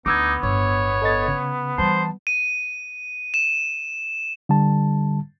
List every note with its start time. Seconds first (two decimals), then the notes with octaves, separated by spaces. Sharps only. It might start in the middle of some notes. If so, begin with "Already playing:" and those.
0.06 D2 B3 D#4 D6 E6 G#6
0.43 G1 A2 C#5
1.02 A4 D#5 A6
1.28 C#3
1.78 E3 G3 C5 A5
2.27 D#7
3.34 E7
4.49 D3 G3 A5